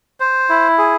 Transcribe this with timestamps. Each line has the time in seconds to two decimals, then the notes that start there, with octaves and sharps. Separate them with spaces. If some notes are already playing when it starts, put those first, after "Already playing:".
0.20 C5
0.49 E4
0.78 G#4